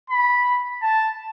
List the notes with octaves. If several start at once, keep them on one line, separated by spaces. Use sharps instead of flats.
B5
A5